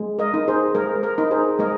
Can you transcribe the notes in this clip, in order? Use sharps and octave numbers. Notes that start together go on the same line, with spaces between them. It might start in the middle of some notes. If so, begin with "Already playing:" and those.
Already playing: G#3
A#4 D#5
D#4
G#4 C5
G#3 A#4
A#4
D#4
G#4 C5
G#3 A#4 D#5